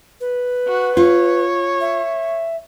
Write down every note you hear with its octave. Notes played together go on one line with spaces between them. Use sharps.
B4
F#4
F4 C#5
E5